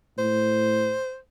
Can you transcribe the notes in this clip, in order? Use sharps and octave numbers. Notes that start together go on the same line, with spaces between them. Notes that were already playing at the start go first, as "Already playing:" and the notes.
A2 C5